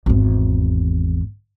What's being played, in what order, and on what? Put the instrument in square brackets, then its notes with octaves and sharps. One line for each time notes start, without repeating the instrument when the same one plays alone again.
[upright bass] G#1 E2